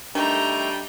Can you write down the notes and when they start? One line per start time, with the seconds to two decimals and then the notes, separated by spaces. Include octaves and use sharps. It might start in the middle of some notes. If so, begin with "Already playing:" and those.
0.15 D#3 G3 A3 D4 G5 A#5